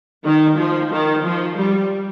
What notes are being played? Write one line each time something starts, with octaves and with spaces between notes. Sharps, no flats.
D#3
F3
D#3
F3
G3